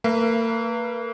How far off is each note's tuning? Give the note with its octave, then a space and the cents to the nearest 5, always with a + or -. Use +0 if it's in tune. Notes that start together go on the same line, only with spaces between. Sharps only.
A#3 -40 B4 -25 E5 +45